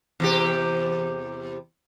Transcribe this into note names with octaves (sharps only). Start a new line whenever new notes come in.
E2 C3 G4